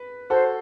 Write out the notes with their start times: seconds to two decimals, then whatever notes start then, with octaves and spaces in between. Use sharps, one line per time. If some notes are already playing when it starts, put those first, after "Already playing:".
Already playing: B4
0.30 F#4 A4 C5